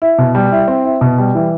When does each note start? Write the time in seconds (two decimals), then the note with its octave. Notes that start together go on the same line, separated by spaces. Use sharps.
0.02 E4
0.18 B2
0.35 G3
0.52 E4
0.68 C4
0.85 E4
1.01 B2
1.18 G3
1.35 E3